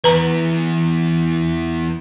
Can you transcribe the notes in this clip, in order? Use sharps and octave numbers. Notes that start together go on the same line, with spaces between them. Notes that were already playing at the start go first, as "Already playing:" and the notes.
E2 E3 B4 A#5